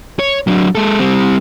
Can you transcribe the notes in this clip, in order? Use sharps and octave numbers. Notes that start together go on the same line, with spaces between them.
C#5
F#3 D4
G#3 A4
G3 C4